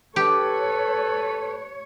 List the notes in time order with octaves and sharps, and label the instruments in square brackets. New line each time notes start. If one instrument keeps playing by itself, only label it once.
[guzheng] G4 [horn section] A4 B4 [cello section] C#5